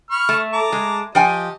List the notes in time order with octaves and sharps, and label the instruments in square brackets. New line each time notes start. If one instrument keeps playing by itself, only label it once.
[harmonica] B5 C#6 F6
[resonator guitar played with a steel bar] A3
[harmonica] A5 A#5 D6
[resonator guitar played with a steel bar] G#3
[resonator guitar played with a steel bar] F3 G5 G#5 [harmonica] G4 D#5